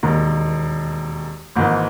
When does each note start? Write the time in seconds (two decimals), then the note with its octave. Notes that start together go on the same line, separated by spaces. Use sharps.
0.03 E1 D#2 D#3 A#3
1.56 G#1 G#2 E3 A#3